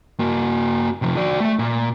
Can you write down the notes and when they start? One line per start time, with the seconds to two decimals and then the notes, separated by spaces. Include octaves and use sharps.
0.20 A#3 F#4
1.02 C3 F3
1.16 F#4 D5
1.40 A3 E5
1.59 A#2